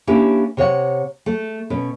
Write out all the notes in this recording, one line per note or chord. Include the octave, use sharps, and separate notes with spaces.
A#3 C#4 D4 E4 G4
C3 C#5 F5 F#5
A3
B2 C#4 B4